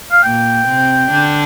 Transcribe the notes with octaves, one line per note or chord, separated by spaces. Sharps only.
F5
A#2 A#3 G5
C3 C4
D3 D4